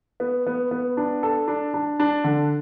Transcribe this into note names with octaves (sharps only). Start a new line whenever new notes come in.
B3
B3
B3
D4
A4
D4
D4
D4
D3